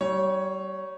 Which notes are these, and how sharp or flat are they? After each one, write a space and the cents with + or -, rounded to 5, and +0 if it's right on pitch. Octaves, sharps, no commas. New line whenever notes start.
G3 -35 C#5 +0